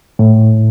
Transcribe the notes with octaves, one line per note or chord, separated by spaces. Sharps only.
A2